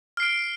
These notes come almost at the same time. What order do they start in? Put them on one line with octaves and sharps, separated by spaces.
F6 C7 D7